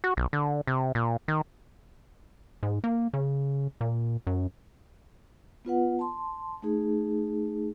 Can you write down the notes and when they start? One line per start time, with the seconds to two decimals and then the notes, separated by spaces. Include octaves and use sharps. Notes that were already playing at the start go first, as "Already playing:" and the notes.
0.04 F#4
0.17 B1
0.33 D3
0.67 C3
0.95 A#2
1.28 D#3
2.63 G#2
2.84 A#3
3.14 C#3
3.81 A#2
4.27 F#2
5.65 B3 F4 B4 F#5
5.99 A5 C6
6.62 A3 D#4 G#4